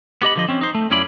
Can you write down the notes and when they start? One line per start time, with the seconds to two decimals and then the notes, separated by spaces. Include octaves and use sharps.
0.22 B3 G4 D#5 B5
0.36 D3 F3 D#5
0.49 C4 C#4
0.61 D#4 C5
0.75 A3
0.91 F#2 C#4 E4 F4 D5 B5